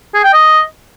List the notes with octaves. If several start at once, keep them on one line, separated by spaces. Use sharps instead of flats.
G#4
G5
D#5